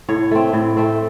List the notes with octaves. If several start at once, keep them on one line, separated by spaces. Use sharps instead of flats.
A2 C#5
A3 C4
A2
A3 C4